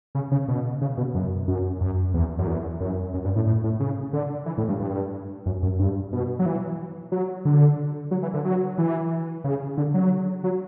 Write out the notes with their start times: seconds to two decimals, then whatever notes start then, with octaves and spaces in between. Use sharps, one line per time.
0.15 C#3
0.32 C#3
0.48 B2
0.81 C#3
0.98 B2
1.15 F#2
1.48 F#2
1.81 F#2
2.14 E2
2.39 F#2
2.47 E2
2.80 F#2
3.14 F#2
3.24 G2
3.36 A2
3.47 A2
3.64 A2
3.80 C#3
4.13 D3
4.46 E3
4.58 A2
4.69 G2
4.80 G2
5.46 F#2
5.62 F#2
5.79 G2
6.12 B2
6.39 F#3
6.46 E3
7.12 F#3
7.45 D3
8.11 F#3
8.23 E3
8.34 D3
8.45 F#3
8.78 E3
9.44 C#3
9.77 D3
9.94 F#3
10.44 F#3